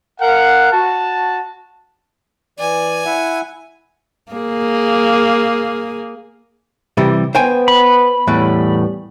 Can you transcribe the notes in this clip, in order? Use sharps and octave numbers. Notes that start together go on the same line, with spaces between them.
A#4 F5 F#5
F#4 A5
E3 D5 G#5
E4 E5 F#5
A#3 G#4
C3 E3 G3
B3 C5 G5 G#5
B5
E2 A2 G3 B4